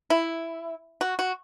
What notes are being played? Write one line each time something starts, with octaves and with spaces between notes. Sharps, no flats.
E4
F#4
F#4